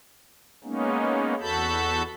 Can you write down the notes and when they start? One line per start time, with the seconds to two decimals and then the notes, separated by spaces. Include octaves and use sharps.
0.64 G#3 A#3 B3 C#4 D#4
1.41 E2 F#4 A4 A5 B5 G6